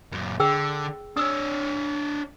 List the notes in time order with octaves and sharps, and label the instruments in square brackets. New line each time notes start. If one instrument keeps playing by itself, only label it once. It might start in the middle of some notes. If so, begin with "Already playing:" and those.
[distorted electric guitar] F#2 A#2
[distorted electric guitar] D3 [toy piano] G#4 G5 E6
[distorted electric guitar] D4 C#5 [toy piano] D#6 E6